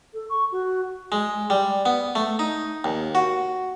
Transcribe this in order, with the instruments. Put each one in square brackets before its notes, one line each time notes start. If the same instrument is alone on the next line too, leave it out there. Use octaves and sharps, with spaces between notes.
[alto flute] A4
C#6
F#4
[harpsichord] G#3
G3
B3
A3
D#4
D#2
F#4